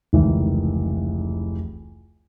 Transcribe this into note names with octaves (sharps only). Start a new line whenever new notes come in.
F1 C#2 D#3 E3